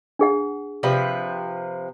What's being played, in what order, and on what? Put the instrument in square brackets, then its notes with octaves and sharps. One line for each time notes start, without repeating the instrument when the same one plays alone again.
[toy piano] D4 G#4 F#5
[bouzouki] C3 F3 B4